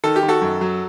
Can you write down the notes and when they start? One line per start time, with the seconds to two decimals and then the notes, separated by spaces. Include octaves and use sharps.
0.04 D#3 A4
0.16 G4
0.23 D#3
0.28 F#4 A4
0.42 F#2
0.61 F#3